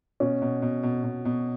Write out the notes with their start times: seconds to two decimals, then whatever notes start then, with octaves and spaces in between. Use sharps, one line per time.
0.20 B2 C#4
0.42 B2
0.62 B2
0.83 B2
1.04 B2
1.25 B2